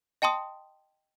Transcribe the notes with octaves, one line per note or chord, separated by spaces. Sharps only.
D#5 G5 A5 C6 D#6